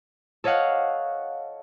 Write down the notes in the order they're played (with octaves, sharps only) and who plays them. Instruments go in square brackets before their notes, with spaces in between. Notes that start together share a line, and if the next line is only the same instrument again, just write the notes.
[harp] A4 C#5 D#5 F5 F#5